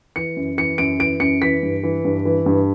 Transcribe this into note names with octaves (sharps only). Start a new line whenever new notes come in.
E3 C#7
F#2
E3 C#7
F#2 D7
E3 D7
F#2 C#7
E3 B6
G2
E3
G2
E3
G2